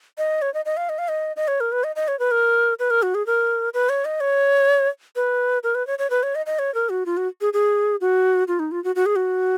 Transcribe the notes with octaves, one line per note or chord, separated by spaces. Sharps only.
D#5
C#5
D#5
D#5
F5
D#5
F5
D#5
D#5
C#5
A#4
B4
D#5
D#5
C#5
B4
A#4
B4
A#4
F#4
G#4
A#4
B4
C#5
D#5
C#5
B4
A#4
B4
C#5
C#5
B4
C#5
D#5
D#5
C#5
A#4
F#4
F4
F#4
G#4
G#4
F#4
F4
D#4
F4
F#4
F#4
G#4
F#4